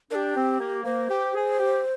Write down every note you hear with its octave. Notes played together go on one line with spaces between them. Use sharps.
D4 G4 A#4
C4
A#3
A#3 C5
G4
G#4
G4